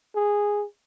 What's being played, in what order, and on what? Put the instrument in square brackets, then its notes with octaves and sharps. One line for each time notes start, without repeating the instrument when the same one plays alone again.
[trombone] G#4